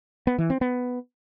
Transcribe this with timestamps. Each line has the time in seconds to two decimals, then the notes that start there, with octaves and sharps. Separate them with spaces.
0.27 B3
0.38 E3
0.50 C4
0.61 B3